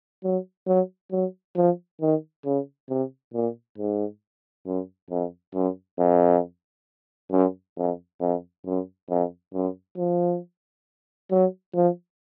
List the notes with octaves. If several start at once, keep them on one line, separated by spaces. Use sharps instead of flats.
F#3
F#3
F#3
F3
D#3
C#3
C3
A#2
G#2
F#2
F2
F#2
F2
F#2
F2
F2
F#2
F2
F#2
F3
F#3
F3